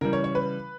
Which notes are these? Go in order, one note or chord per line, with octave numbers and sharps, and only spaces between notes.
C#3 E3 G3 A#4
C#5
C#5
B4